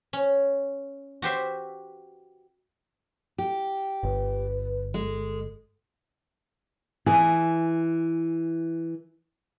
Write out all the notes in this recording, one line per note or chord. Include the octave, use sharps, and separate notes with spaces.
C#4
F#4 G4 C5 E5
G4
G1 B4
G#3 A4
E3 G#4